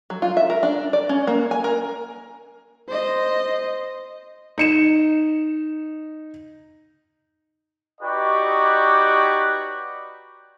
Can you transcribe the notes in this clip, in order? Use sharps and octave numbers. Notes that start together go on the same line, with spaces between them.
F#3
F4
E5
A#4
D4
D5
C#4
A#3
G#5
A#4
C5 D#5
D#4 C#7 E7
D#4 F#4 G4 B4 C#5 D5